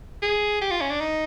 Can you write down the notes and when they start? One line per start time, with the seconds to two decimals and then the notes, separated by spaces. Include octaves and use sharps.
0.22 G#4
0.61 G4
0.71 F4
0.81 C#4
0.90 D4
1.00 D#4